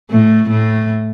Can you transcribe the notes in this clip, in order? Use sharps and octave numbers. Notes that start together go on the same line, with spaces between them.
A2 A3
A2 A3